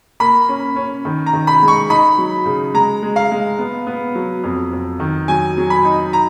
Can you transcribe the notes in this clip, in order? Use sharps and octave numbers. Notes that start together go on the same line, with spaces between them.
A#3 B5
C#4
C#4
D#3
A#5
D#3
B5
G#3
C#6
D#4 B5
F#3
C#3
G#3 A#5
G#3
F5
G#3
B3
B3
F#3
F2
F2
D#3
F#3 G#5
F#3
B5
D#4
A#5